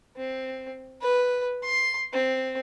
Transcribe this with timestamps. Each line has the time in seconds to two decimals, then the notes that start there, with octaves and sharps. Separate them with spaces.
0.16 C4
1.02 B4
1.63 C6
2.13 C4